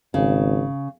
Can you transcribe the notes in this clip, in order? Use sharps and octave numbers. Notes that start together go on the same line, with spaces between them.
G#1 C#3